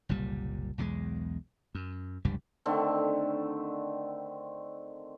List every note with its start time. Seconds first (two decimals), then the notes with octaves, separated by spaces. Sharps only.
0.09 F#1 C2 A#2 G3
0.78 B1 E2 F3 G#3
1.75 F#2
2.25 F1 C#2 G2 G3
2.66 D3 D#3 A3 C4